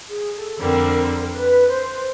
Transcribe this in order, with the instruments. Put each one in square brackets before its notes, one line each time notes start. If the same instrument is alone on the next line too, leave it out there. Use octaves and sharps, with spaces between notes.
[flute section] G#4
A4
[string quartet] F2 D3 G3 C4 [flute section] A#4
[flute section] B4
C5